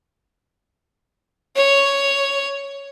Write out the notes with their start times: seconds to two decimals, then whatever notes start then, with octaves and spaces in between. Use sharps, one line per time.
1.56 C#5